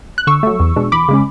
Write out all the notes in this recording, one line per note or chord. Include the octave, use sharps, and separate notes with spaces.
F#6
D3 C#6 E6
F#3 A3
E2
B2 G#3 D4
E2 B5 D6
C#3 G#3 C#4